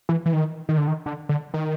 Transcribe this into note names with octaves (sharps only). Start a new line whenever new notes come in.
E3
E3
D#3
D#3
D3
D#3
D3
D3
D#3